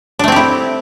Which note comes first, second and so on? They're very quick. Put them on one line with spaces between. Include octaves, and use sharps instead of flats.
D4 A3 C4 G4 E4